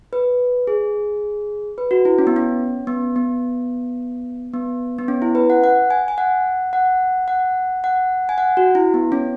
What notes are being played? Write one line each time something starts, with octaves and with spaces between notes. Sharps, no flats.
B4
G#4
B4
F#4
E4
C#4
B3
C#4
B3
B3
B3
B3
C#4
E4
B4
F#5
F#5
G#5
G#5
F#5
F#5
F#5
F#5
G#5
F#5
F#4
E4
B3
C#4